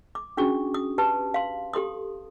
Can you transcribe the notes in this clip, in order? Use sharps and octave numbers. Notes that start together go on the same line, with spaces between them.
D6
C#4 D4 F#4 G#4 C#6
D#6
G4 B4 A5
F5 C6
G4 A4 C6 D#6